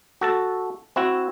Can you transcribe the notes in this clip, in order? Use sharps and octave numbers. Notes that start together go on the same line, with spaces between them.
F#4 A4 A5
C4 E4 F#4